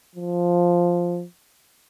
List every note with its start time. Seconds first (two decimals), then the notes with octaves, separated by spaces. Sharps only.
0.15 F3